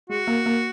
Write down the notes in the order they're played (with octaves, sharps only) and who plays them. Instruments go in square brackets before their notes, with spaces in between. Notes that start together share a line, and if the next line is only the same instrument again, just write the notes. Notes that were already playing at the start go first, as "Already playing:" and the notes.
[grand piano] G#3 [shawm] F#4
[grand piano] A#3
A#3